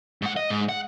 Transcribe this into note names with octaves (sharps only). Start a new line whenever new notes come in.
G#2 F#5
D#5
G#2
F#5